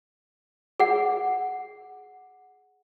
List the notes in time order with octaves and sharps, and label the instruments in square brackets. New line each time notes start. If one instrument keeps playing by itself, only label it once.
[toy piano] G#4 F#5